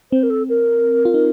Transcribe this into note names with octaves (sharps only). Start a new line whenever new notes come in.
C4 C5
A#4
A4
A#4
F4
D#4